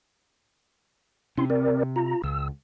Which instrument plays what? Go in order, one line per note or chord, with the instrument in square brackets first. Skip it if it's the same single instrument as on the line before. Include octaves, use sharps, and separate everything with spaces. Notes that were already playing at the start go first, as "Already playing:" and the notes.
[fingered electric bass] C3 [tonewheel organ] C#4 E4 C6
[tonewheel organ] C4 A#4 D5
F4 A#5
[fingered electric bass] C#2 [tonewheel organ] E6